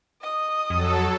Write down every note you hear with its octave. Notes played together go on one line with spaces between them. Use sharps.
D#5 D#6
F2 F#3 A4